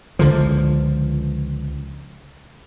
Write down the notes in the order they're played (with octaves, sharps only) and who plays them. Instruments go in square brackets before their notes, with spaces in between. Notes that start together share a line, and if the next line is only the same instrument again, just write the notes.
[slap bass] C#2 D3 F3